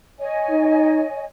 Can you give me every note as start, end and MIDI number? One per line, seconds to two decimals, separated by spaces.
0.20 1.24 73
0.20 1.24 75
0.20 1.24 80
0.49 1.02 63